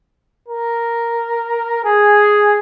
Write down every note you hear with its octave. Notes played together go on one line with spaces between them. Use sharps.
A#4
G#4